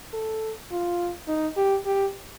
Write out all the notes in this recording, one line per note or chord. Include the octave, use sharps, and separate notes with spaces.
A4
F4
D#4
G4
G4